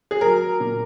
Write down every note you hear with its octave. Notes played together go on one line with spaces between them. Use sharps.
G#4
F#3 A#4
F#3
A#2